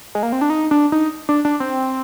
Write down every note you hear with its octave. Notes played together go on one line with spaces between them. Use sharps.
G#3
A#3
C4
D4
D#4
D4
D#4
D4
D4
C4